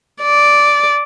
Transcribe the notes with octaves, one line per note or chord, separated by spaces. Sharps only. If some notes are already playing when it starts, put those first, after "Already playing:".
D5